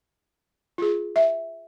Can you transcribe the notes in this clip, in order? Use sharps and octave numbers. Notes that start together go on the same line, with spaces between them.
F4 G#4
E5